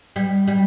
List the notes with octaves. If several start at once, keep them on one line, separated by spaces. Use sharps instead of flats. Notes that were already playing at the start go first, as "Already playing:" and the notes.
G3
G3